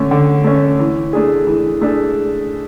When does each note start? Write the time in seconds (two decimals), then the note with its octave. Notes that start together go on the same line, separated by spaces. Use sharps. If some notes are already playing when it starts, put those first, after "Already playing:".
Already playing: D3 A3 C#4
0.11 D3
0.44 A3 C#4
0.80 E3
1.13 A3 D4 G#4
1.47 E3
1.81 A3 D4 G#4